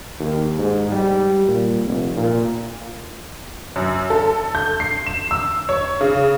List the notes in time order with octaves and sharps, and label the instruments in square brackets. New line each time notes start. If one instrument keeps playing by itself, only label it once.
[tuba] D#2
G#2
G3
A#2
F1
A#2
[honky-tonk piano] F#2
A4
G6
C7
E7
E6
C#5
C#3